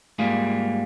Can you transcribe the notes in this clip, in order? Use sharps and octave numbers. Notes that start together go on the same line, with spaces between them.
G#2 G3 A#3 F4 G#4